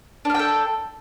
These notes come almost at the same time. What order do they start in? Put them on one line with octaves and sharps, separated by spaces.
D4 F5 G5 A4